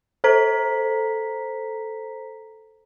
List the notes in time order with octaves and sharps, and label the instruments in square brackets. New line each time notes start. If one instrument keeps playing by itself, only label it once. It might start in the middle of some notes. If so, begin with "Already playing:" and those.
[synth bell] A4 C5 A#5 B6